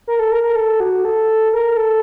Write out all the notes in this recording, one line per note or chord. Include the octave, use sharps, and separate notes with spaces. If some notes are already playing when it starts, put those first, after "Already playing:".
A#4
A4
A#4
A#4
A4
F#4
A4
A#4
A4